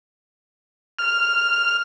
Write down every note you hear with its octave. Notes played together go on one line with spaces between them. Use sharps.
F6